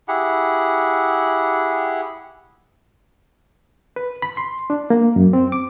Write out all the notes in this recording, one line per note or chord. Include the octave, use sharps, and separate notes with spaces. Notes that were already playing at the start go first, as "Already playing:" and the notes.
E4 G4 G#4 F#5
B4
B5
C6
D4
A#3
F#2
C4
D6